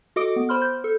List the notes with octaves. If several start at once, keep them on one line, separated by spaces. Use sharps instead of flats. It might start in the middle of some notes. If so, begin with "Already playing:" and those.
F#4 A4 D#5 D6 D#6 D7
B3
C5 B5 C6 F6
G6
A4